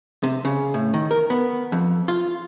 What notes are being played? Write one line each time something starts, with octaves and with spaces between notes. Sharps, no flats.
C3
C#3
A2
D#3
A#4
B3
F2
F4